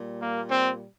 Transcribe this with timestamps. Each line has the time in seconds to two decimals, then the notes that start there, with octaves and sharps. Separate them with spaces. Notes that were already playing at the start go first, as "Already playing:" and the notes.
Already playing: A#2 G3
0.21 A#3
0.50 C4